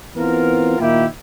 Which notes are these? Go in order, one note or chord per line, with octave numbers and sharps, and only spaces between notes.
E3 B3 C4 F4 A#4
A#2 D#3 A#3 E4 G4